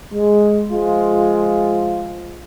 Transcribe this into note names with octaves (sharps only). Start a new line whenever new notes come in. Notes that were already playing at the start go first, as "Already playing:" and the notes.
G#3
F3 G#3 F4